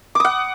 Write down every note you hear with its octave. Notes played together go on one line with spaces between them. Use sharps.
F#5 D6 D#6